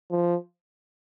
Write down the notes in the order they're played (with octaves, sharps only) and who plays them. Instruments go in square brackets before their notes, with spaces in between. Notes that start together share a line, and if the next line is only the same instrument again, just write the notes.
[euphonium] F3